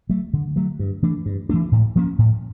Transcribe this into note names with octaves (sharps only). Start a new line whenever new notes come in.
F#3 A3
D3
F#3 A3
G2
E3 A3 D4
G2
E3 A3 D4
A2
F3 A#3 C#4
A2